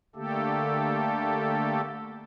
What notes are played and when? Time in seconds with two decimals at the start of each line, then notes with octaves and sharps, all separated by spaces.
0.16 D3 A3 A#3 G4 A4